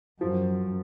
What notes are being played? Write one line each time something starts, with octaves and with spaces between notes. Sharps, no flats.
F#2 F3